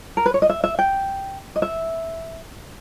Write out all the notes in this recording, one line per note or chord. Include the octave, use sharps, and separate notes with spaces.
A#4
B4
C#5
D#5
E5
E5
G5
D#5
E5